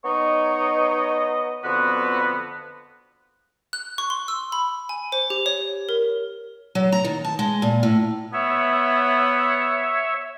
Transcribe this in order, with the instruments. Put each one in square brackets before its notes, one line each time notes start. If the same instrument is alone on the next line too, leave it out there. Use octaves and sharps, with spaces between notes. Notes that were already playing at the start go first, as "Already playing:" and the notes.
[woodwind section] B3 D#4 C#5 D#5
F2 D3 B3 F#4 B4
[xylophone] F#6
C#6
C6
E6
B5
G#5
C5
G4
C#5
A#4
[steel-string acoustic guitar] F#3
A#5
D#3
A5
G#3
A#2
A2
[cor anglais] B3 [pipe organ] C#5 E5